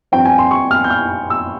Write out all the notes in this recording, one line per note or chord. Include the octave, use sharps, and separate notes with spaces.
G2 F3 C4 G5
G#5
C6
C#6
F6
G6
F6
E6